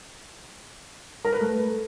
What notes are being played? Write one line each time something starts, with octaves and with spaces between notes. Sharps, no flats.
A#4
B4
A3